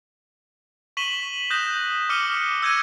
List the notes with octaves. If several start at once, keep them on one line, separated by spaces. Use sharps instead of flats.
C#6 B6 D#7 E7 F#7 G7
D#6 F#6 G6 A#6 E7
D6 F6 F#6 C#7 D#7 G7
E6 G6 G#6 A#6 D#7